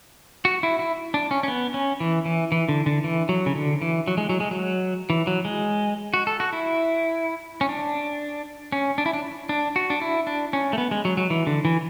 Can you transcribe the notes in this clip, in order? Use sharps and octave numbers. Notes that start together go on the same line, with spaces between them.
F#4
E4
E4
D4
C#4
C#4
B3
C#4
E3
E3
E3
D3
D3
E3
F#3
C#3
D3
E3
F#3
G#3
F#3
G#3
F#3
E3
F#3
G#3
F#4
A4
F#4
E4
C#4
D4
C#4
D4
E4
D4
D4
F#4
D4
E4
D4
C#4
A3
B3
G#3
F#3
F#3
E3
D3
E3